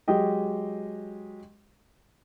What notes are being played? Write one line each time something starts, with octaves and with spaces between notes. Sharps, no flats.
F#3 G#3 G4 D#5